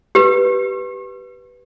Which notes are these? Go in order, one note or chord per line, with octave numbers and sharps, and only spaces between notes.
G4 B4